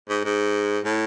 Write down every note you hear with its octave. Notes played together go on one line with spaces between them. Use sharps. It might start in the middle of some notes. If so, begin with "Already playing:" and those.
G#2
G#2
A2